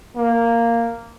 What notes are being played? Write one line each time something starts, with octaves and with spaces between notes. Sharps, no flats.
A#3